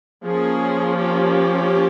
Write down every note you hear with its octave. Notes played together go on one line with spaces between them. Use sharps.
F3 A#3 C#4 G#4
G4